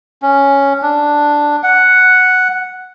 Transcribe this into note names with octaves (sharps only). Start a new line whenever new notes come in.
C#4
D4
F#5